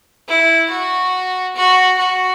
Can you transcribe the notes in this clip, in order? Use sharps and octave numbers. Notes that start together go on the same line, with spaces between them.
E4
F#4
F#4
F#4